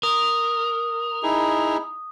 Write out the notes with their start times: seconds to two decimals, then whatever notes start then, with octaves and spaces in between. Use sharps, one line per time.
0.03 A#4 D#6
1.23 D#4 E4 G#4